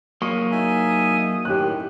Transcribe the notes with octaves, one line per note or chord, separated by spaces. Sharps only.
F#3 A#3 C#6 D#6
D#4 E5 G#5
F#2 A2 D#3 G4 F#6